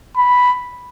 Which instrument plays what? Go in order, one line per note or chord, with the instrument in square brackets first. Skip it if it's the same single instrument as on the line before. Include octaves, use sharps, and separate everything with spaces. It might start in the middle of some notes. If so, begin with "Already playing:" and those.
[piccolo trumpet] B5